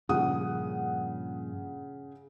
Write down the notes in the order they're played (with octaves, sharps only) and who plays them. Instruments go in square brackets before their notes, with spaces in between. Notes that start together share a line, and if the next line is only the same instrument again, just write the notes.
[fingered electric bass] G2 A#2 F3 [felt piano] C#3 F#5 D#6